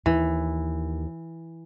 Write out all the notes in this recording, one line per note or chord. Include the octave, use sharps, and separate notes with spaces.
D#2 E3